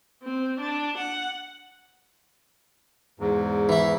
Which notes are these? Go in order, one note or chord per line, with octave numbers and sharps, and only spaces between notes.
C4
D4
F#5
E2 G#2
E3 E4